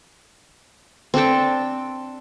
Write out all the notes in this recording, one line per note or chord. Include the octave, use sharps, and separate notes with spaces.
C4 D4 A4 G5